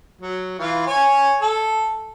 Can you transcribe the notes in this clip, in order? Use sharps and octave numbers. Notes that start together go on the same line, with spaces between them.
F#3
E3 F4
C#5 G#5
A4